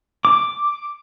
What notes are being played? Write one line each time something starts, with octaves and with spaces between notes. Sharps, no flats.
D6